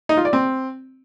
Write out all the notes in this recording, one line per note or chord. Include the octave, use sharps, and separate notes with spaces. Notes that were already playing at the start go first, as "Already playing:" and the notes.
D#4
F4
D5
C4